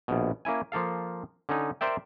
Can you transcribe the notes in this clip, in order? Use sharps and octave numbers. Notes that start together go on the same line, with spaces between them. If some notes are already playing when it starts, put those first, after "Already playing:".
A#1 B2
A#3 C#4 E4 G#5
F3 A#3 A4 F5
D3 C#4 D#4
A#4 C5 D5 E5 G5